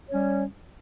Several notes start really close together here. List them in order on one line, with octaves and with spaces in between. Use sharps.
C#5 C#4 G3